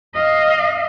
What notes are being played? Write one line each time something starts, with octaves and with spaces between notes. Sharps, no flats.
D#5 F5